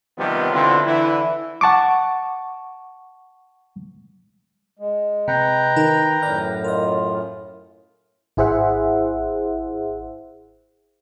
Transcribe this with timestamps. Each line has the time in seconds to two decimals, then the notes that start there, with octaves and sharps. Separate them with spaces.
0.18 C3 D#3 F3 G3 B3
0.52 B2 D3 C4 E4 F4
0.85 D3 E3 E4
1.61 F#5 A5 C#6 D6
4.79 G#3
5.28 C3 B4 G5 A#5
5.76 D#3 D#4 A#4
6.22 F#2 A2 D5 F6 A#6
6.64 F4 A#4 D#5
8.37 G#1 E4 G#4 C5 E5 F#5